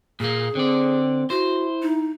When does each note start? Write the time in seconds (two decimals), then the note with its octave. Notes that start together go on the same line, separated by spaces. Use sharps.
0.20 A#2 A#3 G#4
0.55 D3 C4 D5
1.30 E4 F#4 C5
1.82 D#4